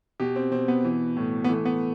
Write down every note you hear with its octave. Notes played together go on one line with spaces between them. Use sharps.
B2 G4
C4
B2 C4
B3
E3
A2
B3
E3 A3
B3